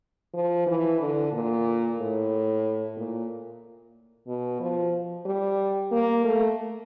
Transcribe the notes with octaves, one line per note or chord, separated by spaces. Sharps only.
F3
E3
D3
A#2
A2
A#2
B2
F3
G3
A#3
A3